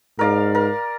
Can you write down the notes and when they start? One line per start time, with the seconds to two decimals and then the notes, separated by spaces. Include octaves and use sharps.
0.19 G#2 A#4 D5 F5
0.55 A#4